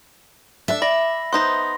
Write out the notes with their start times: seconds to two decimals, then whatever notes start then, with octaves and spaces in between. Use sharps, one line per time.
0.68 D4 A4 E5
0.82 D5 B5 A#6
1.33 B3 D#4 C5 C6 A#6